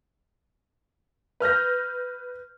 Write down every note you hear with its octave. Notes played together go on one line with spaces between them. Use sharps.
B4 F6 G6 A#6